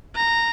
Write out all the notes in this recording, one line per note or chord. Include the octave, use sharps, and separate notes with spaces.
A#5